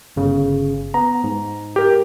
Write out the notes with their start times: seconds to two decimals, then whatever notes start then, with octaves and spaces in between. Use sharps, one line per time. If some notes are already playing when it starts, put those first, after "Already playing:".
0.16 G1 C#3
0.94 B3 A#5
1.24 G#2
1.76 G4 A#4